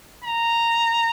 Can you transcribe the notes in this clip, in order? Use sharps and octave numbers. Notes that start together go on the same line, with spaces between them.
A#5